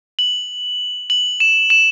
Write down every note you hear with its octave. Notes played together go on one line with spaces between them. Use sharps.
F#7
F#7
E7
E7